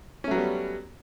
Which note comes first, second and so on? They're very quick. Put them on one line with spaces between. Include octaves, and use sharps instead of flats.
C#4 A3 F#3 B3 G3